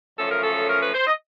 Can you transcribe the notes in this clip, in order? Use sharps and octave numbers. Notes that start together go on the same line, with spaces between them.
F#2 C#3 F3 A3 C#4 A4
A#4
A4
A#4
B4
C5
D#5